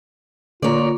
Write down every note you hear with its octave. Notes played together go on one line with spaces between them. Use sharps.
D3 A#3 F4 C#5 D5 A#5